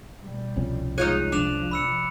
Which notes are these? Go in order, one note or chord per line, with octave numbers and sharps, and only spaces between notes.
B2 G3
C2 F2 C#4
B2 G#3 D#4 F4 C#5 F#6 D#7
C3 F3 D4 D6 E7 F7
B5 E6 C#7